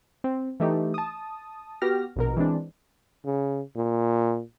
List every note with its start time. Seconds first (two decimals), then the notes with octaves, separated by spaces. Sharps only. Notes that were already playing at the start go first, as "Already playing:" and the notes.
0.24 C4
0.60 E3 A3 D#4 G4
0.94 A5 D#6
1.82 B3 F#4 G4 F6 A#6
2.16 A#1 B2 A#4
2.36 E3 G#3 C4 D4
3.26 C#3
3.76 A#2